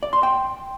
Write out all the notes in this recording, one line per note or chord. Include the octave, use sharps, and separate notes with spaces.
D5
C6
G5